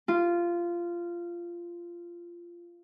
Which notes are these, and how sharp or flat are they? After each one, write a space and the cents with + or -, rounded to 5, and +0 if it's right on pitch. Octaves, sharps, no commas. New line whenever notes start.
F4 -15